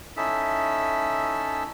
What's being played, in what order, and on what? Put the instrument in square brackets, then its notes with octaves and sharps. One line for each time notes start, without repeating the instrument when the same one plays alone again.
[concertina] C#4 D#4 E4 A4 E5